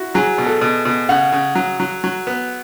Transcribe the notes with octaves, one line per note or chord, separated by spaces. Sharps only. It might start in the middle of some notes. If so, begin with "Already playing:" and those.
Already playing: E4 F#4
F#3 G#4
B2
A4
B2
B2
C#3 F#5
C#3
F#3
F#3
F#3
B3